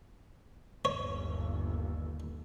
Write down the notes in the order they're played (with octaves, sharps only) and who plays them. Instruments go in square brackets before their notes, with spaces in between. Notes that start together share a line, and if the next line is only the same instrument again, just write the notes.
[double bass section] G1 D#2 [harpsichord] C#5